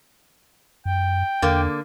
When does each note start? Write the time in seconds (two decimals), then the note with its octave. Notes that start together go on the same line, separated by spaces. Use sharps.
0.85 F#2 G5
1.42 E2 D3 A#3